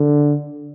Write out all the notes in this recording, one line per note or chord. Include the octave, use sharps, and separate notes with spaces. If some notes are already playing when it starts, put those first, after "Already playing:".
Already playing: D3